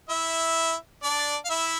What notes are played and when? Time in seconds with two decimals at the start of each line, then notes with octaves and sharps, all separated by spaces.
0.09 E4 E5
1.03 D4 D5
1.45 F5
1.50 E4 E5